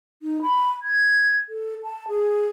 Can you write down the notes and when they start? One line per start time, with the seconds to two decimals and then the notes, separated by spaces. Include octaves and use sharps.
0.22 D#4
0.42 B5
0.82 G#6
1.49 A4
1.83 A5
2.08 G#4